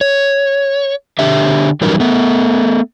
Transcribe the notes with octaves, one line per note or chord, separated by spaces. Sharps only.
C#5
D3 G4 E5
E3 F#3 G3 C#4 D#4 A#4
A3 B3